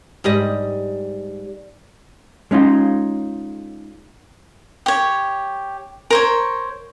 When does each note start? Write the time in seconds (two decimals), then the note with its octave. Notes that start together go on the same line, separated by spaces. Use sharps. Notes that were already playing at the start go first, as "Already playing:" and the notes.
0.24 G#2 G3 D#5
2.51 G#3 C#4 D#4 F4
4.86 G4 C#5
6.10 A#4 C5 C#5